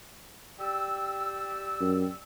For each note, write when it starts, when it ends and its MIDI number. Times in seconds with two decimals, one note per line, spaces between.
0.59 2.22 67
0.59 2.22 74
0.59 2.22 88
1.81 2.07 42